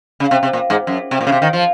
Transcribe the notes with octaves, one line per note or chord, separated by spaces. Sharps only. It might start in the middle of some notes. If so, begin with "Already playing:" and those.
C#3
C3
C3
A#2
G#2
F#2
C3
A#2
C#3
C3
D#3
F3